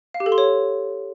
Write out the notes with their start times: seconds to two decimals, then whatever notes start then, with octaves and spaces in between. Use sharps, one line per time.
0.14 F5
0.20 G4
0.26 A4
0.32 C6
0.38 C#5